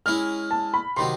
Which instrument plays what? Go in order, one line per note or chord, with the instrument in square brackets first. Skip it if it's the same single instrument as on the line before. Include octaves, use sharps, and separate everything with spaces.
[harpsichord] G#3 C#4 E4 [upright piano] F6
[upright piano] A5
B5
[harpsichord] C3 D#3 F#3 [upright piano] C6